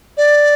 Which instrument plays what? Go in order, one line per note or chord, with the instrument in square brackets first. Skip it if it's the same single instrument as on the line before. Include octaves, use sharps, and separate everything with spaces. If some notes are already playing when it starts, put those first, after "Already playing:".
[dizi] D5